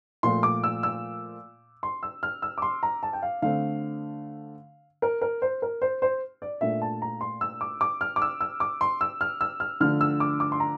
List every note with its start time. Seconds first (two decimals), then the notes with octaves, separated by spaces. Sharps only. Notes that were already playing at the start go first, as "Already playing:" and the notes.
0.23 A#2 F3 A3 C6
0.43 D6
0.64 E6
0.83 E6
1.83 C6
2.03 E6
2.23 F6
2.42 E6
2.58 D6
2.62 C6
2.83 A#5
3.03 A5
3.13 G5
3.22 F5
3.42 D3 A3 C4 F5
5.02 A#4
5.21 A#4
5.42 C5
5.62 A#4
5.82 C5
6.02 C5
6.42 D5
6.61 A#2 A3 D4 E5
6.81 A5
7.02 A#5
7.21 C6
7.41 E6
7.61 D6
7.81 D6
8.01 F6
8.16 D6
8.22 E6
8.41 E6
8.60 D6
8.81 C6
9.01 E6
9.21 F6
9.41 E6
9.60 F6
9.81 D3 F3 A3 D4 F6
10.01 E6
10.20 D6
10.40 D6
10.52 C6
10.60 A#5